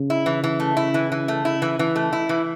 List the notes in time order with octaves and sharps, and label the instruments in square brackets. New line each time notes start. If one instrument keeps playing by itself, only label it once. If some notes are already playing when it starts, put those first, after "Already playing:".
Already playing: [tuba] C#3
[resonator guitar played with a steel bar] E4
E3
E3
A3
E4
E3
E3
A3
E4
E3
E3
A3
E4
E3